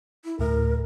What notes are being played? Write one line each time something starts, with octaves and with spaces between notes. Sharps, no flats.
E4
D2 A2 A#4